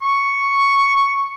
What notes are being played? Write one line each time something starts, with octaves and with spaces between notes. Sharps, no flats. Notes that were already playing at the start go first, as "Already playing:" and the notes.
C#6